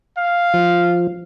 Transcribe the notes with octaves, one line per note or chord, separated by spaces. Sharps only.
F5
F3